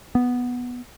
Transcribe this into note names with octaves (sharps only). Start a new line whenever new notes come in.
B3